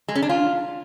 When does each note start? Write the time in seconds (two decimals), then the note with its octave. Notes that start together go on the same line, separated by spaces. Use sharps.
0.08 G#3
0.15 C#4
0.22 D4
0.29 F4